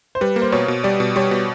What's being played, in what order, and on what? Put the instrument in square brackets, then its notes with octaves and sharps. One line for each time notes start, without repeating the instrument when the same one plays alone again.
[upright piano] C5
[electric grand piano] G3 [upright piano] B4
[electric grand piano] A#3
[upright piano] C5
[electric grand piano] B2 [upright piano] C#5
[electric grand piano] B2
[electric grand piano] G3 [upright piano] D5
[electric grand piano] B2
[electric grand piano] G3 [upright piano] C#5
[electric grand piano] B2